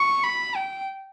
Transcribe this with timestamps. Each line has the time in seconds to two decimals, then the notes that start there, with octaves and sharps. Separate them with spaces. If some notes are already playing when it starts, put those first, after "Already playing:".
Already playing: C#6
0.24 B5
0.56 G5